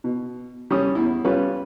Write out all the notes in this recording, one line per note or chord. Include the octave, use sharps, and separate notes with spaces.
B2
G3 C#4 D#6
E2 E4
G3 C#4 F4 B4